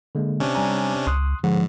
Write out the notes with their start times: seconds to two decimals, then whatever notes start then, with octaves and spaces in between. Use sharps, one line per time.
0.15 D3 G#3 A#3
0.40 C3 C#4 D4
0.55 G3 G#5 A#5
1.07 C#2 C6 D#6 F#6
1.44 G#2 D3 F3 G#3 F#5